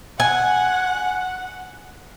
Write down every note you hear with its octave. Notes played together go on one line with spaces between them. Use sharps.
F#5 G#5